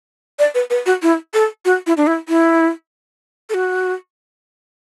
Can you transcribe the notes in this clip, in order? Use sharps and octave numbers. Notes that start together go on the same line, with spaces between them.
D5
B4
B4
F#4
E4
A4
F#4
E4
D4
E4
E4
A4
F#4